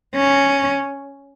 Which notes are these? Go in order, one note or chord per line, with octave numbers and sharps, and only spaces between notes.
C#4